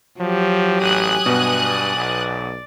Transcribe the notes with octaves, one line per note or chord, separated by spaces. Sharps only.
F3 F#3 G4
A1 G#5 D#6 F#6
G2 B2 B3
D5
B1